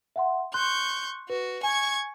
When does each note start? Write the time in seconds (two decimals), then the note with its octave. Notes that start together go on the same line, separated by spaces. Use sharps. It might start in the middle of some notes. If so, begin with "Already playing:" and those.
0.16 E5 F#5 C6
0.54 C6 C#6 F#6 G6
1.30 F#4 B4
1.63 G#5 C#6 G#6